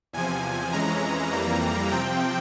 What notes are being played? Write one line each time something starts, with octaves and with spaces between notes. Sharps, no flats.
E2 C3 F3 G#5
F2 E3 G#3 C#4 A#5
F2 E3 G3 A#3
C3 F3 C4 G5